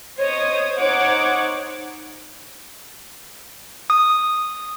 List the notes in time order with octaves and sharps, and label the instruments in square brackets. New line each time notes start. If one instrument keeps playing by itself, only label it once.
[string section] C5 C#5 D#5 D#6
D#4 C5 C#5 F#5 C#6 D6
[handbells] D#6